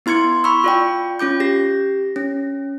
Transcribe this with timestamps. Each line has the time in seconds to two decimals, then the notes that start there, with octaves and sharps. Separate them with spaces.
0.06 B3 E4 C6 G#6 C#7
0.44 B5 C#6 E6
0.64 F4 D5 G5
1.19 C#4 F4 D6 G6
1.40 G4 A#6
2.16 C#4